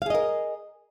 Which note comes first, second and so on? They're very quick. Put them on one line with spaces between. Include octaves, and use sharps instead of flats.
F5 G#4 D#5 A#4